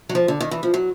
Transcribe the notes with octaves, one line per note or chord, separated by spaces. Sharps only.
F#3
F3
D3
D#3
E3
F3
F#3